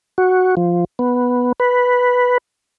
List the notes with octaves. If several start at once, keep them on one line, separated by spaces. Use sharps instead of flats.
F#4
F3
B3
B4